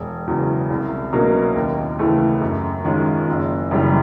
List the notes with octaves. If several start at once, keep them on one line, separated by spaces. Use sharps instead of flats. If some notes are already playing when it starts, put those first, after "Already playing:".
Already playing: E1
E2 C#3 F#3
C2
B2 F#3 A#3 C#4
D#2
C#3 E3 A3
F#2
D#3 G#3 C#4 F4
F#1
F#2 C#3 E3 G3